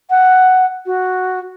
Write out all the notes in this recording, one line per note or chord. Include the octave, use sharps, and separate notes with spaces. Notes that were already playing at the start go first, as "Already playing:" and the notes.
F#5
F#4